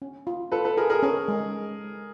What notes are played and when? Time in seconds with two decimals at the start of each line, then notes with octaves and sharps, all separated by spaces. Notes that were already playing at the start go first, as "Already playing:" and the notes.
0.02 C#4
0.27 F4
0.52 F4 A4 B4
0.65 A4 B4
0.77 F4 G#4 A#4
0.90 G#4 A#4
1.03 C#4 G#4 A#4
1.28 G#3